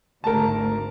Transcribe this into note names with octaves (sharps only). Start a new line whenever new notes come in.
G#1 D2 A#4 A5